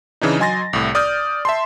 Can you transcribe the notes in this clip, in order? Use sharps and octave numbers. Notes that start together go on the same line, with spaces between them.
C#3 E3 D4 D#4
F#3 D#5 G#5 C6 A6 A#6
C2 A2
D5 D#6 F6 G6
E5 A5 C6